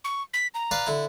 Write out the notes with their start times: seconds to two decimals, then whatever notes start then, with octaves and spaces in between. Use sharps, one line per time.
0.04 C#6
0.34 B6
0.54 A#5
0.71 B4 D5 F5
0.87 D3 E4